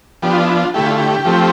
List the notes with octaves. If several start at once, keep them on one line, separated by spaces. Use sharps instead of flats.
F3 B3 D4 G4
F4
E4
F4
D3 A3 E4 G4
F4
G4
F3 A3 C4